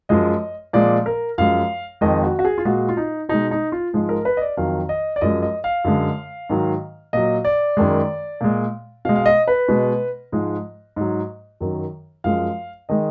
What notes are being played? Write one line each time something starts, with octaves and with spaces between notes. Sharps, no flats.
F#2 F3 G#3 D#5
A#2 F3 G#3 D5
A#4
F#2 F3 G#3 F5
F2 D#3 G#3 D#5
F#4
F#4
G#4
F4
A#2 G#3 F#4
F4
D#4
B2 G#3 D#4
D#4
F4
G#2 F3 G#3
A#4
B4
D#5
D5
F2 D#3 F#3 F5
D#5
D5
F#2 F3 G#3 D#5
D#5
F5
F#2 D3 G#3
G#2 D#3 F#3
A#2 F#3 D#5
D5
F#2 D#3 G#3
A#2 G#3
B2 G#3 F5
F5
D#5
B4
B2 G#3
G#2 F3 G#3
G#2 F#3
F#2 D#3 F#3
F#2 F3 G#3 F5
D#3 G#3 D#5